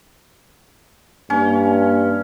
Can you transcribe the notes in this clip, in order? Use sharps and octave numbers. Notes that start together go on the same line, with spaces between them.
G2 A#3 C#4